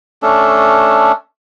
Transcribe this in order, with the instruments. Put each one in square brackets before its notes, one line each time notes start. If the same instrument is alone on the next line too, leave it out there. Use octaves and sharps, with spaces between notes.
[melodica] A3 C#4 D4 A4